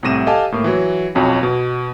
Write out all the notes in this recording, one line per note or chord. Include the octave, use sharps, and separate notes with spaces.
C2 A2 C3 A#6 D#7 E7
G4 A4 D#5 F5 G#5 A5
A2 A#3
E3 F#3
B1 F2 F#3 C#4 G#5
B2